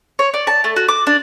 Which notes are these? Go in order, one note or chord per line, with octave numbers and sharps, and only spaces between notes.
C#5
D5
A5
A3
F#4
D6
D4